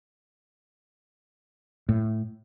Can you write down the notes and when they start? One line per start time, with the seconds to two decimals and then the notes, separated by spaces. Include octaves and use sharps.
1.89 A2